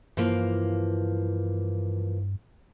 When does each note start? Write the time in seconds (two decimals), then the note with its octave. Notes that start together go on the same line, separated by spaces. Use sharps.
0.17 G2 E3 F3 A#3